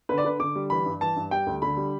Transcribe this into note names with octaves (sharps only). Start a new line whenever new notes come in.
D3 B4
D5
D3 B4
D3 D6
G3
E3 B5
G2
E3 A5
G2
G3 G5
D2
D3 B5
G3